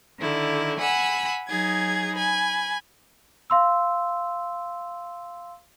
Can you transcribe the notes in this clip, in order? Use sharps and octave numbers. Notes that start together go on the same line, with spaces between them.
D3 D#3 E4
F#5 G#5 B5 E6
F#3 D#4 G#4 G#6
G#5 B5
F5 C6 E6